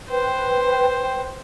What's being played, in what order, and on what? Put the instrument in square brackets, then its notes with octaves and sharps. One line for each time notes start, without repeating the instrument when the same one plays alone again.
[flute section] B4 G5 [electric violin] C5